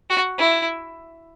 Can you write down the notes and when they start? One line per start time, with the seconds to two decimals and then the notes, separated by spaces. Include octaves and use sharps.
0.10 F#4
0.38 E4